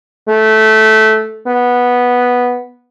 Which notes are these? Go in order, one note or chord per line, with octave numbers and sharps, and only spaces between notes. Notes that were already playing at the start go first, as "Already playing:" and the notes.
A3
B3